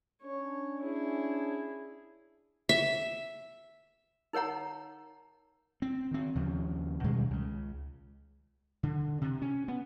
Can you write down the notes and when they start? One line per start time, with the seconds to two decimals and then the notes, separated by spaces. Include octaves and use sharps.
0.23 C#4 D4 C#5
0.82 E4 G#4
2.69 E5
4.33 D#4 A#4 C#5 F#5 A#5
5.82 C4
6.11 D#3 C4
6.35 D#2 C#3 F3
7.04 B2 D#3 G3 G#3
7.31 C#2 C#3
8.83 D3
9.21 C3
9.42 C#4
9.68 B3